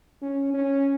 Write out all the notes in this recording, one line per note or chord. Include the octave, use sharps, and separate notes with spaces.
C#4
C#4